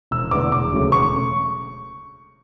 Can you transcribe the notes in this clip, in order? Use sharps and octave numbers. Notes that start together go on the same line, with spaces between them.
E1 E6
E2 D3 A3 D6
E1 D6
D2 C#3 F#3 A3
E1 C#6